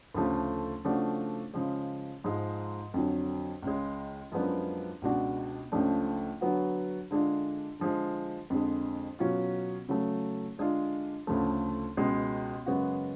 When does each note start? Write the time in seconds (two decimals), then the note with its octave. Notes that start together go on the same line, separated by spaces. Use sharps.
0.14 D2 C#3 F3 A3
0.84 C#3 F3 A3 D4 F#4
1.54 C#3 F3 G#3
2.24 G#2 F3 G#3
2.94 F2 D3 F#3
3.62 C#2 C#3 G#3
4.32 F#2 F3 G#3 B3 D4
5.02 C#2 B2 G#3 D4 F#4
5.72 C#2 C#3 F3 A3 D4
6.41 D3 F#3 B3 F#4
7.11 D3 G#3 D4 F4
7.79 D3 F3 G#3
8.50 F2 D3 G#3
9.19 B2 F#3 C#4 F4
9.89 C#3 F#3 A3
10.58 D3 G#3 D4 F4
11.27 D2 C#3 F3 A3
11.97 C#2 B2 G#3
12.66 F#2 C#3 G#3 B3 F#4